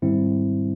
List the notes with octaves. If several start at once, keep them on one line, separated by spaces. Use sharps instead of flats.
G#2 D#3 G3 C4 E4